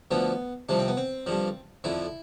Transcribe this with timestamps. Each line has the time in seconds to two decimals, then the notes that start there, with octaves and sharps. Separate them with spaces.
0.11 D2 D3 F3 B3
0.69 C2 C3 F3 D4
0.79 C4
0.88 B3
0.97 C4
1.26 G2 D3 F3
1.84 F2 D3 F3 E4